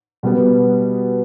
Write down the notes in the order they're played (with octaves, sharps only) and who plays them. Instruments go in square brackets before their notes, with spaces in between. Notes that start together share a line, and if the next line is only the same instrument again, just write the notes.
[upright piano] B2 G3 B3